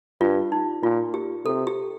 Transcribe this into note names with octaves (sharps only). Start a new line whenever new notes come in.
G2 F4
D#4
A#2 F4
G4
C3 A4
G4